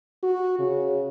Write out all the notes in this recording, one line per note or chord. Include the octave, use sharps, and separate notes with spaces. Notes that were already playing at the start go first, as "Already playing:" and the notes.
F#4
C#3